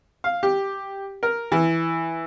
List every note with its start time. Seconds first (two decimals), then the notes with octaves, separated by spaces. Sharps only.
0.24 F5
0.43 G4
1.23 A#4
1.52 E3